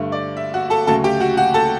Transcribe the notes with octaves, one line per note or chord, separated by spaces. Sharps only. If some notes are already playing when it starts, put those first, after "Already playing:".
Already playing: G2 D3 A3
D5
E5
F#4 F#5
A4 A5
D2 C#3 F#3 A3 A4 A5
G4 G5
F#4 F#5
F#4 F#5
A4 A5